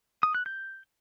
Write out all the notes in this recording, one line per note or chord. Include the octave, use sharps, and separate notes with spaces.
D#6
F#6
G6